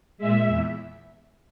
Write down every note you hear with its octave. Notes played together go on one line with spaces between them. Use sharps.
A#2 G#3 E5
E2